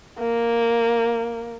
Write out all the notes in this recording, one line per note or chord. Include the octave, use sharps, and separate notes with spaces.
A#3